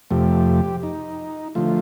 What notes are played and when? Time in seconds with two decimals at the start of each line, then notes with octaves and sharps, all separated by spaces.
0.10 F2 C3 F3 A3 G4
0.83 D#4
1.55 D3 F3 A3 F4